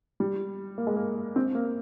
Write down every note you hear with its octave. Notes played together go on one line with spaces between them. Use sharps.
G3
A#3
G#3
A#3
C4
A#3